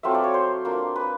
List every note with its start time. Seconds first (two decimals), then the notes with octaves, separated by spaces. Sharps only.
0.03 F#3 A3 C4 F4 E5
0.15 D5
0.24 C#5
0.34 C5
0.65 A#3 D4 F4
0.96 B4